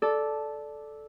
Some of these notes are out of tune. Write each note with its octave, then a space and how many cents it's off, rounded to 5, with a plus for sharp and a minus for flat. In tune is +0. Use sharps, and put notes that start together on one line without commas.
A4 -10 D5 +0